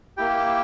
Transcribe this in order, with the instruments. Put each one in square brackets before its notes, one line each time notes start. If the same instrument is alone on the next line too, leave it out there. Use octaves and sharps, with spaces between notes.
[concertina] A#3 E4 G4 G5